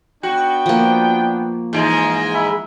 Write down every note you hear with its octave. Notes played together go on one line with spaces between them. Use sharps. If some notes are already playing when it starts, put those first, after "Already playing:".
B3 D4 F#4 G5
F3 A#3
G#2 E3 G#3
E5 G#5 B5